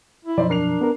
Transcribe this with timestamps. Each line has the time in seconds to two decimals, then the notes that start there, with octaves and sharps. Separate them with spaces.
0.25 E4
0.38 F#2 B2 F3 D#4 C5 D5
0.50 D4 A#4 C7 F7
0.81 B3 A#4